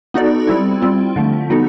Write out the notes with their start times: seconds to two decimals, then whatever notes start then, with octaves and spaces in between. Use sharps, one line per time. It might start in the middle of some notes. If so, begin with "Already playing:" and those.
0.14 B3 D#4 F#4 A4 D5
0.47 G3 C4 E4
0.82 G3 C4 F4
1.16 D3 F3 A3
1.50 G3 B3 D#4 F#4 A4